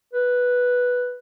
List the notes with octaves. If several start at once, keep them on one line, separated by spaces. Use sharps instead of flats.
B4